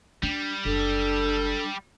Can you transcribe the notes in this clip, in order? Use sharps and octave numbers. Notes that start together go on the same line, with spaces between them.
G3 D4
F#1 D4 A4